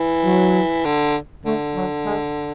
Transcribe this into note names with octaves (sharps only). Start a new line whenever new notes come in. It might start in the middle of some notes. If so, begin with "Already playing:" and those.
Already playing: E3
F#3
D3
D3 A3
F#3
G#3